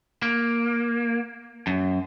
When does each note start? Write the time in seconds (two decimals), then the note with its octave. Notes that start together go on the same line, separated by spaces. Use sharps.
0.22 A#3
1.67 F#2